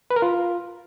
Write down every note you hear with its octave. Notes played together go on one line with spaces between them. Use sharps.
B4
A#4
F4